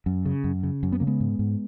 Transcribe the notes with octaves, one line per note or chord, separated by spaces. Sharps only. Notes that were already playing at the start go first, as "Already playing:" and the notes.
F#2
C#3
F#2
C#3
F#2
B3
C#3 A#3
G#3 B3
G#2
G#2